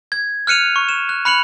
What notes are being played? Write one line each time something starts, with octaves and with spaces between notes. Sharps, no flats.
G#6
F6 F#6 C#7 D#7 F7
C#6
E7
F#6
B5 F#6 C#7 F7 F#7